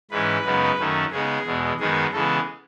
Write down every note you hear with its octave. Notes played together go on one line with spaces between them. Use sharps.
G#2 E3 G#3 C#4 B4
F#2 C#3 G#3 B3 D#4
F#2 D#3 A3 C#4
C#3 G#3 B3 D#4 G#4
E2 B2 G#3
F#2 D#3 G#3 B3 D#4 G#4
C#3 E3 G#3 B3 A4